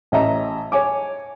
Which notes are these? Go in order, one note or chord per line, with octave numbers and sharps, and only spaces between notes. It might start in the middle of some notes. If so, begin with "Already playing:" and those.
A1 D#5 E5 A#5
C#5 G#5 D6